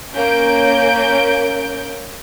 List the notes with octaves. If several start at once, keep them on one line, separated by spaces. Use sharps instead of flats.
A#3 C#4 G6 D7